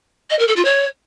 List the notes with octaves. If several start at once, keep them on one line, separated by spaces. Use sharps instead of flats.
D#5
A#4
A4
F4
C#5